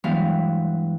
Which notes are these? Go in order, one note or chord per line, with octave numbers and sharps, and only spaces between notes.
G2 E3 F#3 G#3 B3 F5